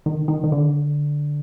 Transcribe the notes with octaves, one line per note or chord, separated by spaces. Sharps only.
D#3
D#3
D#3
D3